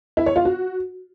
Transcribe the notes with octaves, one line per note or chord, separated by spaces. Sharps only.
E4
C#5
F4
F#4